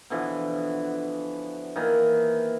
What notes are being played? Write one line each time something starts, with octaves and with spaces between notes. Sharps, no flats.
B2 D3 E3 F3
D#3 E3 A#3